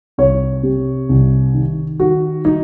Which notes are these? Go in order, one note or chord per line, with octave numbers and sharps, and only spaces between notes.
C2 C#5
C3
C2
D#3
D#3 F#4
D#4